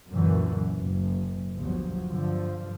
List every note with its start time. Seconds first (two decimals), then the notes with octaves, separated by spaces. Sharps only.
0.11 C#2 F#2 A#2 D3 E3 F#3
0.78 F#1
1.57 G1 D2 F3 F#3
2.10 G2 D3 F3